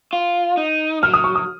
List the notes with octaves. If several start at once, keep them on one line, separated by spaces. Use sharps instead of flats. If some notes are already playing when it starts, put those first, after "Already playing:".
F4
D#4
F#3 F6
D#6
C#6
D#6